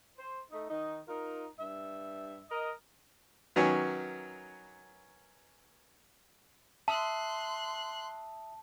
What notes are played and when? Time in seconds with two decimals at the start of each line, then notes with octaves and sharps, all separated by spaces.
0.19 C5
0.51 A3 D#4
0.70 D#3 D#4
1.08 D#4 F4 A#4
1.59 G2 E5
2.51 A#4 D#5
3.56 D#3 F#3 B3 C#4
6.88 E5 A5 C6 D#6 E6 F#6